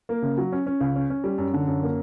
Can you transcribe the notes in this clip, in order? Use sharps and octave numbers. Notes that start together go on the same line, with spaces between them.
A#3
C#3
F#3
C#4
C#4
C#2
C#4
C#4
G3
F#2
D3
F#2
A#3